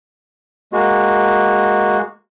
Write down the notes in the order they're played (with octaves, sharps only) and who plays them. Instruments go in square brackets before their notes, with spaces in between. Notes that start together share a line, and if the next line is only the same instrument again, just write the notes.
[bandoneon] G#3 A#3 F#4